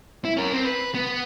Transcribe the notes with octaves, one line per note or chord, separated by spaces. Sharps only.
E4
C#4 A#4
C4
B4
B3